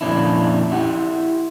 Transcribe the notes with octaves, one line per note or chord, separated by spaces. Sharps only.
F2 A#2 D3 C#4 D4 E4
E4 G4 F#5